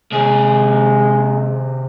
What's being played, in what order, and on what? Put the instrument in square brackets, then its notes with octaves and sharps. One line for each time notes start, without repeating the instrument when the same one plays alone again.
[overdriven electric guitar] C3 G#4 [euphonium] G#3